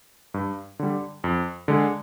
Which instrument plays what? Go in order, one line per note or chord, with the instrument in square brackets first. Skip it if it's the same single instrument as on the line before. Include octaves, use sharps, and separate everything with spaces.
[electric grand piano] G2
D3 G3
F2
D3 G#3